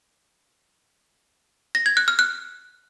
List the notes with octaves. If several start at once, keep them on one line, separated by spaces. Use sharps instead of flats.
A#6
G#6
F#6
F6
F#6